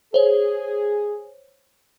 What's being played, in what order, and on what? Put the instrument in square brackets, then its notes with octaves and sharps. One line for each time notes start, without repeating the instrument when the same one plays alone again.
[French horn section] G#4 [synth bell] C5 C#5